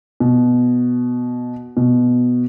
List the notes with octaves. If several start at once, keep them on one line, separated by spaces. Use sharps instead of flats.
B2
B2